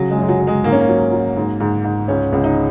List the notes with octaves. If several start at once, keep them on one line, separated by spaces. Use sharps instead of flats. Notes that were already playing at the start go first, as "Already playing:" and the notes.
Already playing: C#3 F#3
G#3
F#2
G#3
F#3
F#3
G#3
G#2 A#3
C#4
A#3
F#3
F#3
G#2
G#2
G#2
C#2 C#4
C#2
D#4